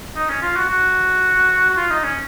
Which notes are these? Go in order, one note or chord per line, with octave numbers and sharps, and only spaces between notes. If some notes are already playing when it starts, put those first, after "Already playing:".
D#4
C#4
F4
F#4
F#4
F#4
F4
D#4
C#4